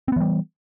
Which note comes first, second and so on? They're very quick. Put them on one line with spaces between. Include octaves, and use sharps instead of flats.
C4 B3 E3 G3